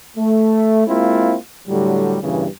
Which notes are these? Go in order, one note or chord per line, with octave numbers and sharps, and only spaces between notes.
A3
G#3 A#3 C4 E4 F4
A2 D3 F#3 G3
E2 G2 A#2 C#3 E3